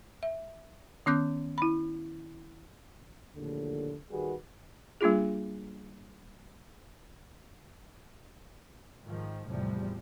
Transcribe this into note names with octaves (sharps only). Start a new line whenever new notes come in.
E5
D#3 B3 C#4 D6 F#6 G6
E4 B5
A#1 D#2 A2 D3
D#3 G3 F#4 G#4 B4
G3 A#3 D4 F4 G#4
G#2 D#3 F3
E2 A2 C3 F3 G3